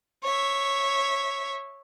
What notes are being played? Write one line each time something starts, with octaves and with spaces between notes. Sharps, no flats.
C#5 E5